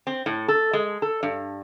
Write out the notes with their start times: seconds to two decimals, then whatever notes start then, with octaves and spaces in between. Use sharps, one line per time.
0.07 C4
0.26 A2
0.48 A4
0.73 G#3
1.02 A4
1.23 G2